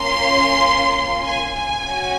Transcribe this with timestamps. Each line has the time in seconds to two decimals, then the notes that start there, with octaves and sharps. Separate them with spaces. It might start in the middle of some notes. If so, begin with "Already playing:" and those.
Already playing: A#3 C#4 F4 C6
1.23 G#5
1.53 G#5
1.83 C#4 F#4